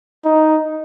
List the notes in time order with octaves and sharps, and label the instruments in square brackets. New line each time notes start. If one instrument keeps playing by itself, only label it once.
[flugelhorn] D#4